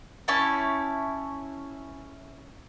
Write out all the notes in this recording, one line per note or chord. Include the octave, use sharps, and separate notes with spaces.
C#4 E4 C#5 A5